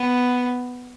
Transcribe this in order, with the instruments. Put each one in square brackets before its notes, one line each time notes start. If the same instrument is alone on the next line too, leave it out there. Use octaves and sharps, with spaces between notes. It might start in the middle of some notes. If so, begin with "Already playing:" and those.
Already playing: [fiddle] B3